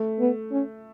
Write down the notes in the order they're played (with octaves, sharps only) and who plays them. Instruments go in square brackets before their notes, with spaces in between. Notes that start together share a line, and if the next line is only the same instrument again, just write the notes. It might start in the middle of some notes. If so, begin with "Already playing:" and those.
Already playing: [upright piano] A3
[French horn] B3
C#4